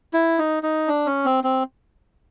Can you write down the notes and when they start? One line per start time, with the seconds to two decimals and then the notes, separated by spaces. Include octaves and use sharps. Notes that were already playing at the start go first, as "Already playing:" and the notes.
0.14 E4
0.38 D#4
0.63 D#4
0.88 D4
1.06 C#4
1.25 C4
1.44 C4